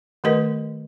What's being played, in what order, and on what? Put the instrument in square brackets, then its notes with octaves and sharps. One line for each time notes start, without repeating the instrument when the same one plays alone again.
[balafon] D#3 A3 G4 A#4 B4 D#5